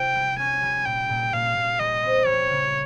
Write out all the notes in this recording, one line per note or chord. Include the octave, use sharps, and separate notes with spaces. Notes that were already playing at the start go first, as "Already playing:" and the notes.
Already playing: C3 F4 G5
G3
C#4 G#5
G3
A#2 G5
A#2
A#2 F5
A#2
G3 D#5
C4
G3 C#5
C#3